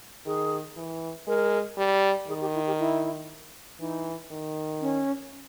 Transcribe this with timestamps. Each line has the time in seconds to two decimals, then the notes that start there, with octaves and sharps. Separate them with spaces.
0.26 D#3 G#4
0.77 E3
1.27 G#3 A#4
1.77 G3
2.28 D#3 G#4
2.41 G4
2.54 E4
2.67 G4
2.79 E4
3.80 E3 D#4
4.31 D#3
4.81 C#4